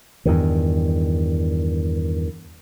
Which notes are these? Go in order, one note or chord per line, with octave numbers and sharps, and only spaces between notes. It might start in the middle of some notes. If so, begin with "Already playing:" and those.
E2 G2 D#3